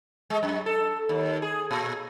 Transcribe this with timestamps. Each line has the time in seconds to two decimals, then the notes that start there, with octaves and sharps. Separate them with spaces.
0.30 G#3
0.43 F#2
0.66 A4
1.09 D#2
1.42 G#4
1.71 A#2